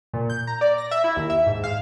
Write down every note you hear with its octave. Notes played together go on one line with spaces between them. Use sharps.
A#2
G6
A#5
D5
A#6
E5
E4
D#2
E5
G#2
F5